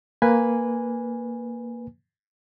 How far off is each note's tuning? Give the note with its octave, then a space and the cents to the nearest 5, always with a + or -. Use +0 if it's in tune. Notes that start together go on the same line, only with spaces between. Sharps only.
A#3 +0 B4 +0 G#5 -10